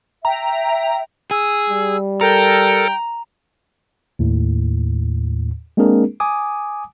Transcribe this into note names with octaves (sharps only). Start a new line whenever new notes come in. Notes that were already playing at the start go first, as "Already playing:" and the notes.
E5 G5 A#5
G#4 E6
G3
A4 A#4 G5 A#5
D#2 A2
G#3 A#3 C4 D4 G#4 A#4
G#5 D6 D#6